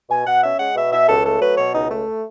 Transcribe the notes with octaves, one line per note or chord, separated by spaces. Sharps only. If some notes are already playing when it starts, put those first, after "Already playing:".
B2 G#5
B2 F#5
C#4 E5
G#3 F#5
B2 E5
B2 E5
C#2 A4
A3 A4
F#3 B4
B2 C#5
C#2 D#4
A3